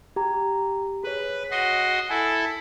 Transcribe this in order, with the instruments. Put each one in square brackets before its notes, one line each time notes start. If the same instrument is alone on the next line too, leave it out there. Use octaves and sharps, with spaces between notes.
[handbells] G4 A#5
[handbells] G#4 C#5 [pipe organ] B4
[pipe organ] F#4 D#5 C6
[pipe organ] E4 A4 [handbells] G#5